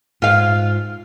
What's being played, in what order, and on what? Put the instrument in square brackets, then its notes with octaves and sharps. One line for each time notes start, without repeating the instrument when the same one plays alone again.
[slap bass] G#2 [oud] F4 F5